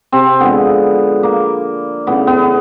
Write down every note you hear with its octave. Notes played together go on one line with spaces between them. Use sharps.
C3 C4
D3 F3 G#3 B3
A#3
C#3 E3 A3 B3
B3